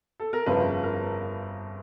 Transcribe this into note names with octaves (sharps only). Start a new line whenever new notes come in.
A4
A#4
G1 F2 C#3 F3 B4
A#4